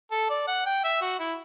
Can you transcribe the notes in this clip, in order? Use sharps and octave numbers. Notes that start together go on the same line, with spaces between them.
A4
D5
F#5
G5
E5
F#4
E4